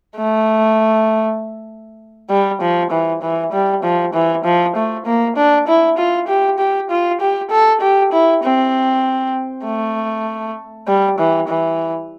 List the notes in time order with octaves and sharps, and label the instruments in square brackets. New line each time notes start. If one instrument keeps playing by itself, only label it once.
[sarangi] A3
G3
F3
E3
E3
G3
F3
E3
F3
A3
A#3
D4
E4
F4
G4
G4
F4
G4
A4
G4
E4
C4
A3
G3
E3
E3